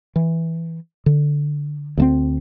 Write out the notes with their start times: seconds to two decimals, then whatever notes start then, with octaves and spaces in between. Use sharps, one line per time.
0.16 E3
1.06 D3
1.97 D2 A3 C4